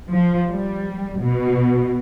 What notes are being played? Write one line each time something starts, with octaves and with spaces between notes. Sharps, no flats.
F3
G3
B2